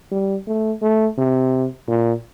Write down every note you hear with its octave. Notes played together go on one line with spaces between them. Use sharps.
G3
A3
A3
C3
A#2